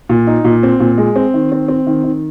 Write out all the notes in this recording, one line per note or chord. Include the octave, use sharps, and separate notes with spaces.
A#2
D#4
A#2
C4
A#2
G#3
C4
D#3
C4
C4
D#3
D#3